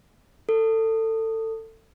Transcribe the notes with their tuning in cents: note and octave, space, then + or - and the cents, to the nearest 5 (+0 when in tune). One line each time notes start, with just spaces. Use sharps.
A4 +25